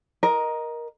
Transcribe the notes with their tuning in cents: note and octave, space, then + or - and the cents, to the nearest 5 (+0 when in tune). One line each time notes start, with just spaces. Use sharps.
A#4 +15 D#5 +0